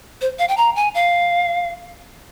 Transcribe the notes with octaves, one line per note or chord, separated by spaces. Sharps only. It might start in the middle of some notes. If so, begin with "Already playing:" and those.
C5
F5
G5
A#5
G#5
F5